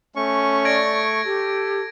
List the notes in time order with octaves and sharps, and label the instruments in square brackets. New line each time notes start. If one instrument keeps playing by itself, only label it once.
[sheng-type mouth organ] A3 C#6 [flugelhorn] C#4
[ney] D5 [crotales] G#6 A#6 D7
[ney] G4 [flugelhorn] A4